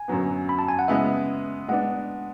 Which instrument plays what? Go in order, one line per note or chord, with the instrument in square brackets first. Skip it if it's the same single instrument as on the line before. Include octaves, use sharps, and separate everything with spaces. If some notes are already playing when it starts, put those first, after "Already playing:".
Already playing: [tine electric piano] G#5
[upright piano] F#2 D3 F#3 B3
[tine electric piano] B5
A5
G#5
F#5
[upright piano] C#3 G#3 B3 E4 B4 [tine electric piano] E5
[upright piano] G#3 B3 D4 [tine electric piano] F#5